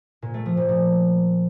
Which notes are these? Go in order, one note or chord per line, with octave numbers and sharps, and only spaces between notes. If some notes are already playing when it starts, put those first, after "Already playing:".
A#2
A3
F3
A#2
A#2